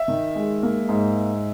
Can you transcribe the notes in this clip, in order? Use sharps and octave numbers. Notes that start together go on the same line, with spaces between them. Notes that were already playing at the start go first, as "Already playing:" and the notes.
Already playing: E5
D#3
G#3
A#3
G#2